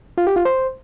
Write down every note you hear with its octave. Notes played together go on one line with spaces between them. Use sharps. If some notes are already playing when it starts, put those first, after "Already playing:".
F4
G4
F4
C5